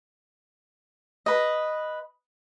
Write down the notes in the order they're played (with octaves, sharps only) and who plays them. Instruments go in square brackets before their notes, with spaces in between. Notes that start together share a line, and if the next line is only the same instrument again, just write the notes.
[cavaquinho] B4 D#5